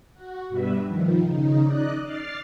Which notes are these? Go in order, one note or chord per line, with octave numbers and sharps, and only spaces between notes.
F#4
G2 B2 G3 B4 E5
D#3 F3
C#3 D#4
D5 D#5 F#6
D6 F6 A6 C7